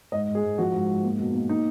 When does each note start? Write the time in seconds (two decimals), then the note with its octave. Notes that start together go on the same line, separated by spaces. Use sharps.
0.12 G#2 D#5
0.28 G#2
0.35 G#4
0.43 G#2
0.58 F3 F#4
0.74 G#2
0.89 G#2
1.03 A#3
1.20 B2
1.35 A#3
1.49 A#3 D#4